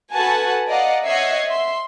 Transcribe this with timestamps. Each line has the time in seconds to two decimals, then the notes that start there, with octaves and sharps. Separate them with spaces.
0.14 F#4 A4 B4 F#5 G#5 A5
0.69 D5 D#5 F5 F#5 A#5
1.05 C#5 D#5 E5 F#5 G#6 C7
1.47 E5 C6